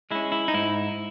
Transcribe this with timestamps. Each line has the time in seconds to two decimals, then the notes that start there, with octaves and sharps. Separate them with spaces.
0.11 G#3 C#4 E4
0.32 E4
0.48 D#4
0.54 G#2 E4